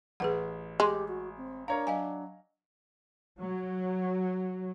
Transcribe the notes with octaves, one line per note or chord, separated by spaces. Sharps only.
A1 G#4 B4 F#5
G#3 G4
F#4
C4
D4 A#4 C#5 F5 A#5
F#3 D#5 F5 G#5
F#3